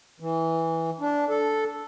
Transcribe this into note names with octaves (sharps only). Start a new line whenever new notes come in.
E3
D4
A4